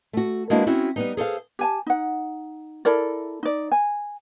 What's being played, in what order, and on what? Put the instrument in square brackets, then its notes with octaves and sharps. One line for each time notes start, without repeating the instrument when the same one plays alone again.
[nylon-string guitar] A3 F#4
G#3 A#3 B3 D4 E4 F#4
C4 C#4 E4 F#4
G3 B3 D#4
G#4 A4 C5 F5
[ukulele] G4 G#5 A5
D#4 F#5
E4 A4 A#4 D5
D#4 D5
G#5